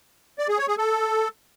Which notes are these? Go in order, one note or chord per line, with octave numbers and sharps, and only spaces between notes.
D5
G#4
C#5
G#4
A4